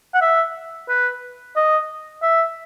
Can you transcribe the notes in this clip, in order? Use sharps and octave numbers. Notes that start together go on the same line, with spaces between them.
F#5
E5
B4
D#5
E5